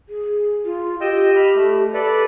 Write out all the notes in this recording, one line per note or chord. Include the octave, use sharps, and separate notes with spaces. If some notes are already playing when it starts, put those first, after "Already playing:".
G#4
F4
G4 D#5 G5 E6
B5 F6
A3
A4 B4 D5